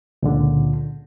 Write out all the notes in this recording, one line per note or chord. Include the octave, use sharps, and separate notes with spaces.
C#2 A#2 D3